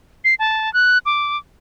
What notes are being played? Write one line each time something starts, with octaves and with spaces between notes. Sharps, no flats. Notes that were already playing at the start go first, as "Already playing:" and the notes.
C7
A5
F#6
D6